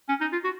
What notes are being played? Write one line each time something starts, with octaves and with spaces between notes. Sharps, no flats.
C#4
D#4
F4
F#4